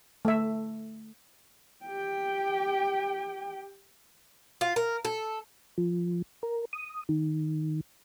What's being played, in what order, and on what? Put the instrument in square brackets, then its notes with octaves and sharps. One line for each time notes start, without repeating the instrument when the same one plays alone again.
[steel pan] A3 E5
[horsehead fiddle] G4 G5
[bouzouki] F4
A#4
A4
[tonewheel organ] F3
A#4
D#6
D#3